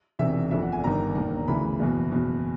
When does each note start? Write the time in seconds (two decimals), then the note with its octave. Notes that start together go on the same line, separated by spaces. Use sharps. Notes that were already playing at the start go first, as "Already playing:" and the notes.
0.19 E1 E2 C3 D#3 E5
0.51 G1 F2 D3 E5
0.62 F#5
0.72 G#5
0.84 G1 G2 D#3 A#5
1.15 E1 D#2 D#3
1.48 D2 C#3 E3 B5
1.79 F#1 E2 B2
2.11 F#1 E2 B2